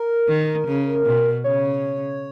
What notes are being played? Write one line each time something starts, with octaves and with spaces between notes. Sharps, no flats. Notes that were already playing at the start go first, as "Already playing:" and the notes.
Already playing: A#4
D#3
C#3
B2
C#3 C#5